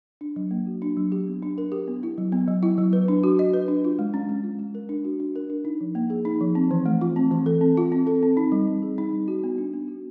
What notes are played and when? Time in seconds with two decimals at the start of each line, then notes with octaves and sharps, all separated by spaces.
0.21 D4
0.36 F#3
0.51 A#3
0.67 F#4
0.82 D4
0.97 F#3
1.12 G4
1.27 B3
1.43 D4
1.58 A#4
1.72 G4
1.88 B3
2.03 E4
2.18 F#3
2.32 B3
2.48 F#3
2.63 E4
2.78 F#3
2.93 B4
3.08 D4
3.24 F#4
3.39 D#5
3.54 B4
3.68 D4
3.84 F4
3.99 G#3
4.14 C#4
4.29 G#3
4.44 F4
4.59 G#3
4.75 A#4
4.89 D4
5.05 F#4
5.20 D4
5.36 A#4
5.50 D4
5.65 D#4
5.81 F3
5.95 A#3
6.10 G#4
6.25 D#4
6.41 F3
6.55 C4
6.71 E3
6.86 A3
7.01 F4
7.16 C4
7.31 E3
7.46 A4
7.61 C4
7.77 F4
7.92 C4
8.07 A4
8.23 C4
8.37 D#4
8.52 G3
8.67 C4
8.83 G#4
8.98 D#4
9.13 G3
9.28 F#4
9.44 B3
9.58 D4
9.73 B3
9.88 F#4